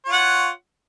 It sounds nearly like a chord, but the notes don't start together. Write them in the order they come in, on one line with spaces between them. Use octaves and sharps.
C#5 F4 F#5